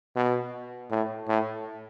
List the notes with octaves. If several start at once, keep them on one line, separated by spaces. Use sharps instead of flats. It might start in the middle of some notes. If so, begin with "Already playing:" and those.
B2
A2
A2